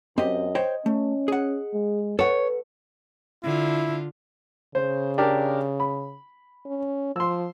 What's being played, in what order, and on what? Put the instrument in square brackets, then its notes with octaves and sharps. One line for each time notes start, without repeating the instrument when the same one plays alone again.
[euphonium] F#2 [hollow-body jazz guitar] C4 G4 [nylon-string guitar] D#5
[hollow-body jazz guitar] C5 C#5 G5
[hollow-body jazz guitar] A3 [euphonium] C#4
[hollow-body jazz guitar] G#4 F#5
[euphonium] G#3
[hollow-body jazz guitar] A4 F#5 [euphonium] B4 [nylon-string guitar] C#5
[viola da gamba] D3 F4 [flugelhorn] E4
[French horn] C#3 [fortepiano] C5
[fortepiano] D4 G4 A#4
B5
[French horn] C#4
[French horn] F3 [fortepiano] C6 E6